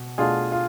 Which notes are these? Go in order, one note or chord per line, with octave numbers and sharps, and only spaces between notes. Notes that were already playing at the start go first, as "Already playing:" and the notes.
Already playing: B2
B2 A3 D4 F4 G#4
F4